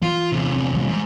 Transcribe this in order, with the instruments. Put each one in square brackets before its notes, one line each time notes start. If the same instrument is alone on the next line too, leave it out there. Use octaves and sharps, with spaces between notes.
[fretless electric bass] E3 [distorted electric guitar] F4
[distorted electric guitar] E2 C3
[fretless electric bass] C4
E3 G3 G#3
[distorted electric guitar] G#2